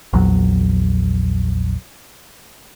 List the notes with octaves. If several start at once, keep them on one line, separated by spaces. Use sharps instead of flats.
A#1 E2 F#3